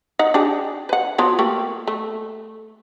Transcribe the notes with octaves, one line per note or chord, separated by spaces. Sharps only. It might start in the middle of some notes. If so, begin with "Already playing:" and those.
D#4 F#5
D4 G4 G#4
B4 F#5
F3 F#3 B3
A3 A#3 G4
A3